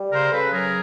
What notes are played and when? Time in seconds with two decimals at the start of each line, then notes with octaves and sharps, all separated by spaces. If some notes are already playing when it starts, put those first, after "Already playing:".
Already playing: G3
0.12 C#3 A#4 C5
0.31 C#3 A4 B4
0.51 F#3 G#4 A#4